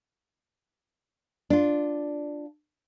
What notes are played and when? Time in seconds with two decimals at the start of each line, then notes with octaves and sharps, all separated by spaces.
1.50 D4 F4